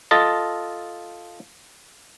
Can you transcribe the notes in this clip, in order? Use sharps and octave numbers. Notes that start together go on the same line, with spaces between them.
F4 A4 D#5 A5